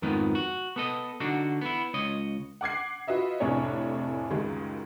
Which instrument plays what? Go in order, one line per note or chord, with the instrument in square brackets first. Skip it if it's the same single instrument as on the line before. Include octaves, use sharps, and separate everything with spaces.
[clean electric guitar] F2 G#2 D#3 F3 B3
F#4
B3 A4 D#5
D3 D4 D#4 F#4
B3 E4
C#2 C#5 D#5
[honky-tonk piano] F#5 D6 G#6 C7
F4 F#4 B4 D#5 E5
F1 A2 C3 D4 G#4 C#5
C#2 F#2 D#3 G3 G#3